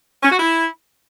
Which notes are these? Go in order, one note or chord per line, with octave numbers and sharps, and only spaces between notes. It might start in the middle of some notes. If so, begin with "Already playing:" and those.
C#4
F#4
E4